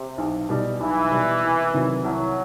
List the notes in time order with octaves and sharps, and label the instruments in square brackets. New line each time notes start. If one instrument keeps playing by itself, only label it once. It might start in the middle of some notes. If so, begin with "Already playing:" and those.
Already playing: [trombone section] C3
[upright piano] B1
B2 G3 D#4
[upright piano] B1 [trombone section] E3
[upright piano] B2 G3 D#4
C2
C3 D#3 F#3
[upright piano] C2 [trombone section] F#3